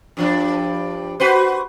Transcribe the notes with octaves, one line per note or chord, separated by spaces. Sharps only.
G2 F3 D4
F#4 B4 C5